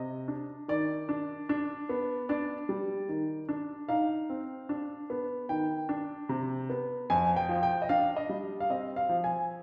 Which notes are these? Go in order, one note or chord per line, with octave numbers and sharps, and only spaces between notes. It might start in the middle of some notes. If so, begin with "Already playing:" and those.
Already playing: C3 D#5
D4
D#3 D5
D4
D4
B3
D4 D5
G3
D#3
D4
D#4 F5
C4
D4
B3
D#3 G5
D4
C3
B3
F2 G#5
G5
F3
G5
D#5
D4 F5
D#5
G3
F5
C4 D#5
F5
F3
G#5